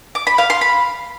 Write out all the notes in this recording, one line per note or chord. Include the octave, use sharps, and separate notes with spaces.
D6
B5
F5
C6
B5